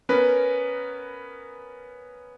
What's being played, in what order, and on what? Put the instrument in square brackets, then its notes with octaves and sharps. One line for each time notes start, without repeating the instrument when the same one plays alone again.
[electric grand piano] B3 C#4 A#4 B4